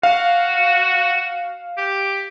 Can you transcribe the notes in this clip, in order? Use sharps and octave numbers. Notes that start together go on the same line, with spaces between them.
F#4 F5
G4